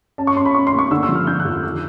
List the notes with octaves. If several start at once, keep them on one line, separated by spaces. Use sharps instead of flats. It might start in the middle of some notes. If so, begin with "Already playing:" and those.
C#4 A5
C#6
C#4 C6
B5
C#4 C#6
C6
A#3
C#6
D3 E6
E6
F3
F6
D3 G6
F#6
F2
F6
D#3 E6